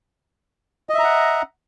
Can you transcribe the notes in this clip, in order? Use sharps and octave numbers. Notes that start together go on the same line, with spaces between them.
D#5 E5 F#5 A#5